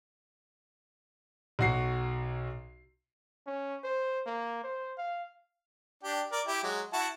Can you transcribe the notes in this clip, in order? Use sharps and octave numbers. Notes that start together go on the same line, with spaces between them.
B1 F#4 C7
C#4
C5
A#3
C5
F5
D4 G4
A#4 D5
E4 G4
F#3 G#3
E4 F#4 A5